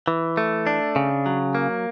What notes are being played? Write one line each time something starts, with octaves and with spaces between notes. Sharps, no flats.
E3
A3
D4
C#3
F#3
A#3